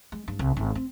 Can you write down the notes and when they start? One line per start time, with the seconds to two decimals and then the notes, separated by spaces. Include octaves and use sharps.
0.12 G#3
0.28 G2
0.39 C2
0.57 G#1
0.75 C4